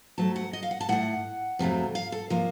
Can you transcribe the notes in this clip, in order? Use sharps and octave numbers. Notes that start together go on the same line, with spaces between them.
C3 F#3 A3 A5
F#5
D#5
F5
F#5
A5
A2 A3 F#5
F2 C3 F#3 A3
F5
A4
C3 F3 A#3 C5